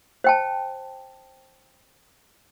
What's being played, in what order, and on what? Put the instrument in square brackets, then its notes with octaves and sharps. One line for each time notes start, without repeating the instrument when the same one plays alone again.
[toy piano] C5 G5 A5